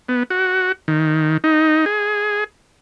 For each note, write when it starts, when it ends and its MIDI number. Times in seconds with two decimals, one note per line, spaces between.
0.08 0.23 59
0.30 0.72 66
0.88 1.37 51
1.44 1.85 63
1.86 2.44 68